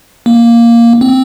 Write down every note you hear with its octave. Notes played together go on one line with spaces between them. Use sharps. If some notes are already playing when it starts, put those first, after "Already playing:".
A#3
C4